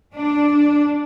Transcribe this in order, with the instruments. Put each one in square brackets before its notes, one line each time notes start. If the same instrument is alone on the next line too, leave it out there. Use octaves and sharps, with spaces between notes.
[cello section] D4